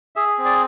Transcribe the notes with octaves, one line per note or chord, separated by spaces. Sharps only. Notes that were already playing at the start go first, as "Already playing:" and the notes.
G#4 E5
C4
D5